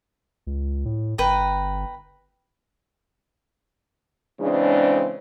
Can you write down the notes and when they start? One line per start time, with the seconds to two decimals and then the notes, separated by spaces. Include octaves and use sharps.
0.47 C#2
0.85 A2
1.18 G1 B4 G5 A#5
4.40 C#3 E3 G#3 C4 D4